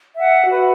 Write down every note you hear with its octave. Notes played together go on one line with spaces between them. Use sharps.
E5 F#5
F#4 B4